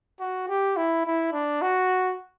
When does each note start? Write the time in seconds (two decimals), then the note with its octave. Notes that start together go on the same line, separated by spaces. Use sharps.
0.20 F#4
0.48 G4
0.77 E4
1.05 E4
1.33 D4
1.62 F#4